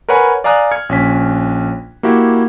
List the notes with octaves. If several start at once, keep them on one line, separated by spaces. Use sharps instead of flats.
A#4 B4 C#5 F#5 G#5 B5
D5 F5 G#5 A#5 D#6 F#6
F6 G#6 C#7
A#1 C#4 B6
A#3 E4 F#4 G4